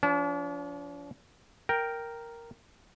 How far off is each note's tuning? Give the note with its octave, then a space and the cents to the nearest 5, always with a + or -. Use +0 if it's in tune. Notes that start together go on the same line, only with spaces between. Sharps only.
F3 -5 D4 -45 A5 -25
A#4 +0 G5 +0